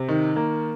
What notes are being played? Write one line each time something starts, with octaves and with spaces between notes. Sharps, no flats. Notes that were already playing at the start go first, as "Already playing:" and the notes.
Already playing: C3
D#3
A#3